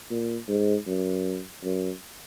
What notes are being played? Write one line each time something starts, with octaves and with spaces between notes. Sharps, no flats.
A#2
G#2
F#2
F#2